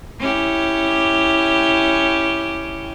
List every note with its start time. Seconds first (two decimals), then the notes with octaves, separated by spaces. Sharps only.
0.20 C#4 E4 G4